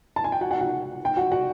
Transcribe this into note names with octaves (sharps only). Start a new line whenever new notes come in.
A5
G#5
G5
F#4 F#5
F#4 F#5
F#4 F#5
G5
F#4 F#5
F#4 F#5